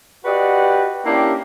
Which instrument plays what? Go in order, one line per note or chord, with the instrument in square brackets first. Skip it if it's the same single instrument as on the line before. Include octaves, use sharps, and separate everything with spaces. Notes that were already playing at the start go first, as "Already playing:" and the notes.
[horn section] F#4 G4 B4 D5 D#5 F#5
A#3 C#4 D4 E4 G4